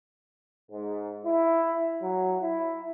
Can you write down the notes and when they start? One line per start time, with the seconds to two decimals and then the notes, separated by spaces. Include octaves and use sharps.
0.72 G#2
1.24 E4
2.02 F#3
2.42 E4